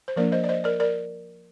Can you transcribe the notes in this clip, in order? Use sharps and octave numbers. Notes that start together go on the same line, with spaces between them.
C5
F3 A#3 D4 A#4 D5
C5 D#5
D5
C5 D#5
A#4 D5
A#4 D5